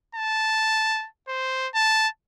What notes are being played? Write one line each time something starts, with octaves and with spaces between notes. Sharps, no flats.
A5
C5
A5